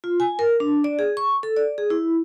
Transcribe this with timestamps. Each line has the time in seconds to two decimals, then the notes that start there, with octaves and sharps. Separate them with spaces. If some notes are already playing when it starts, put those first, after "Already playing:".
0.04 F4
0.20 G#5
0.39 A#4
0.60 D4
0.84 D5
0.99 G#4
1.17 C#6
1.43 A4
1.56 D5
1.78 G#4
1.90 E4